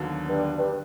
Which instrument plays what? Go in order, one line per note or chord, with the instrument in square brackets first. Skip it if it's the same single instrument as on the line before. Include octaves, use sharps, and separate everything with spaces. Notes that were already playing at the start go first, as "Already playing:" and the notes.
Already playing: [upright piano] D#2 D3 F#3 B3
[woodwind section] G2
G2